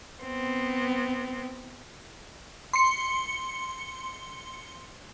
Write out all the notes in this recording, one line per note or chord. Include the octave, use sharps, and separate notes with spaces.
B3 C4
C6 C#7